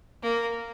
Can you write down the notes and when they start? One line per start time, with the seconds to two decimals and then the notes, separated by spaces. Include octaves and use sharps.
0.23 A#3